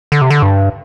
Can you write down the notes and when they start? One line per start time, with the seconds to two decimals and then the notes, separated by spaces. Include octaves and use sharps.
0.12 D3
0.22 C3
0.30 D3
0.42 G2